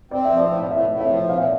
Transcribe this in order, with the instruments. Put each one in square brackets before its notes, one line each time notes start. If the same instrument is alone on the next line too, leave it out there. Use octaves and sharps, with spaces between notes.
[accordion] C4 [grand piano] D5
[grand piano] E5
[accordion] F3
[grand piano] D5
[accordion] A2
[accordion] A2 [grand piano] E5
[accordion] A2
[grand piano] E5
[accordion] F3
[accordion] A#2 [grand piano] F5
[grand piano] E5